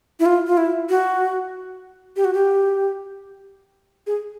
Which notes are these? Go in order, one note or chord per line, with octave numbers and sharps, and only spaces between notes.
E4
F4
F4
E4
F#4
G4
F#4
G4
G#4